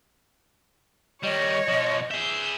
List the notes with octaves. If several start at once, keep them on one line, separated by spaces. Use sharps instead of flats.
D#3 G3 C#5 D#5
B2 F3
G#4 E5 G6